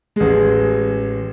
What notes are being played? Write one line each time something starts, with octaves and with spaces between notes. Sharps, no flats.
A1 G#3